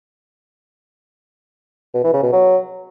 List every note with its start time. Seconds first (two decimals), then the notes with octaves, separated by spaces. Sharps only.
1.94 B2
2.04 E3
2.13 C#3
2.23 B2
2.33 F#3